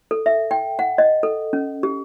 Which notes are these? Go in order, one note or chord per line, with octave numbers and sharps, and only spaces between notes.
A4
E5
G5
F#5
D#5
A4
C#4
G4